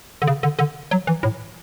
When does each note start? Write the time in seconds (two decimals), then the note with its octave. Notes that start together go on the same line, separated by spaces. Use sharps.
0.22 D3
0.27 C#3
0.43 D3
0.59 D3
0.91 F#3
1.07 E3
1.23 A2